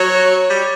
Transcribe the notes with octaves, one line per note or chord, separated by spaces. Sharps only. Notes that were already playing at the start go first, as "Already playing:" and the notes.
Already playing: F#3 C#5
G3